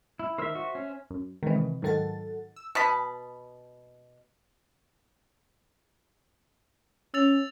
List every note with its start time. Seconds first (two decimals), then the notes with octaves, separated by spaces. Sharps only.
0.19 E4
0.38 D#3 A#4 C5 E5 E6
0.55 F#4
0.75 C#4
1.10 F#2
1.43 D#3 E3 G#3 C4
1.56 C3
1.82 G#2 D#3 F#3 A4 F#5 A6
2.56 E6
2.75 B2 A5 B5
7.14 C#4 E6 A6 F7